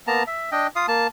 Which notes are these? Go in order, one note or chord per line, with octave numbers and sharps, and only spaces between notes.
A#3 B3 A5 A#5
E5
D4 D#5 G5
F4 F5 D#6
A#3 A5